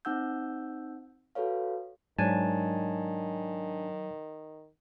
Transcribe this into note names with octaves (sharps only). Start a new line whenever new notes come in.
C4 D#4 F#5 E6 G6
F#4 A4 B4 C#5 F5
G#2 D#3 F#3 D4 C#5 G#5 A5